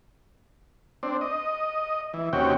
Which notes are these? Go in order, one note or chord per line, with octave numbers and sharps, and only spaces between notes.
C4 D4
D#5
E3
D#2 C3 C#4 F#4 G5